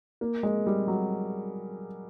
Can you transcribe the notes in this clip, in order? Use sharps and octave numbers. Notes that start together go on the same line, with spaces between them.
A#3
G#3
G3
F#3